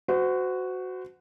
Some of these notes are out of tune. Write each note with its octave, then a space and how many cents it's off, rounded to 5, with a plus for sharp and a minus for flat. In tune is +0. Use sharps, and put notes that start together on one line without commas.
F#4 +0 C5 -35